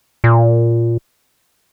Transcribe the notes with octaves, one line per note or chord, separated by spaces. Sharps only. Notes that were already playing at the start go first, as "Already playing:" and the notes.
A#2